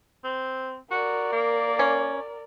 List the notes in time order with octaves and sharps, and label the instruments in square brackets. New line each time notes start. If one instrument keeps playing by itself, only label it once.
[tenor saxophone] C4
[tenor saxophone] F#4 [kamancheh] A#4 D5
[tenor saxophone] A#3
[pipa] C#4